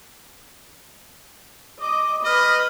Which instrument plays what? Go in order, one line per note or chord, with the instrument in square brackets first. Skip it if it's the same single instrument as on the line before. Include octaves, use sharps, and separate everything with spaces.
[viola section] D#5 [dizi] D6
[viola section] B4 B5 [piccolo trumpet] D#5 [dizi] F6